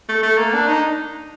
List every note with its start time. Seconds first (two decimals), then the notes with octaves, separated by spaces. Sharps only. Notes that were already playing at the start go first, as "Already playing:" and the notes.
0.09 A3
0.23 A3
0.38 A#3
0.53 D4
0.68 D#4